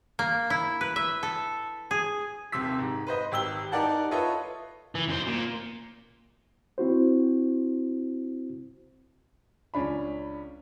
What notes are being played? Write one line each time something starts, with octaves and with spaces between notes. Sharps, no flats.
A#3
E4
B4
E5
A4
G#4
D#1 C3 C6 E6 B6
G#2
B4 C5 D#5
G#1 G4 E6 G7
D#4 G4 A#4 D5 F#5 A5
F4 A4 B4 C#5 D#5 E5
E3
F#2 C5
A#2
C4 E4 F#4 C5
C#2 C#4 D4 B5